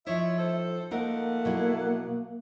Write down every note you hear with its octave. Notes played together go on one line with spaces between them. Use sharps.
F3 D#4 E4 C#5 E5
A2 A4 C5
F3 A3 A#3 D#4 A#4 F#5
B2 F#3 E4